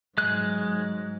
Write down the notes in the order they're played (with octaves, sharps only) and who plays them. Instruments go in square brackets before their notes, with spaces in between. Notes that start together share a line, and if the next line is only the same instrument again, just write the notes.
[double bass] G#2 F#3 [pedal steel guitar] G#3 F#6